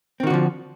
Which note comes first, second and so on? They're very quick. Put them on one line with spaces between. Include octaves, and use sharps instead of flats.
C4 D#3 F#4 D3 F3